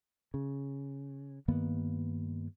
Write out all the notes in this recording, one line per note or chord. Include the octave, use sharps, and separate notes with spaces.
C#3
G2 D#3 A#3 B3